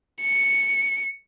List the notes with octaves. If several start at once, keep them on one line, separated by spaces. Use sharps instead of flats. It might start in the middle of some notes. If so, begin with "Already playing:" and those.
C#7